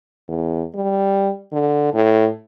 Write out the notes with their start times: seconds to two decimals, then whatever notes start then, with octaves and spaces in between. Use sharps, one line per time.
0.28 E2
0.74 G3
1.52 D3
1.94 A2